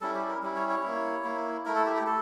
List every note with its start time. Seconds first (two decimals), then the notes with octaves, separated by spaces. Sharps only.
0.01 G3 C#4 E4 A4
0.15 G4
0.29 A#4
0.43 G3 C#4 E4
0.56 C#5
0.70 C#5
0.83 A#3 E4
1.24 A#3 E4
1.65 A3 E4 A#4
1.75 A4
1.86 G4
1.96 G4
2.06 A4